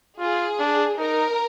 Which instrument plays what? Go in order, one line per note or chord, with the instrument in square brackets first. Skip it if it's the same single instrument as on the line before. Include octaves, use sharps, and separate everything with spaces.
[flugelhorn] F4 [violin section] G#4
[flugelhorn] D4
[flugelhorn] D#4 [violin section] A#4